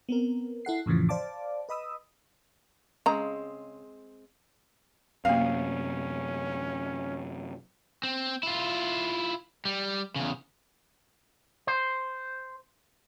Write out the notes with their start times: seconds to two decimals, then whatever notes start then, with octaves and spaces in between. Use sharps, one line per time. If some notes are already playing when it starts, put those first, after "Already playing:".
0.09 B3 C4 A#4
0.65 E4 A4 F#5 C7
0.86 F2 A2 C#3 E3 F3
1.09 C5 D5 F5 A5 D6
1.69 B4 D#5 B5 D#6 E6
3.06 C#3 G#3 C4 A#5
5.25 F#2 C3 A#3 C4 C#4 F5
8.03 C4
8.43 E4 F4
9.65 G3
10.16 E2 C#3
11.67 C5